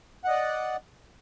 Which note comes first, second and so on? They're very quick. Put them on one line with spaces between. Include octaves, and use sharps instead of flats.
F#5 D#5 D5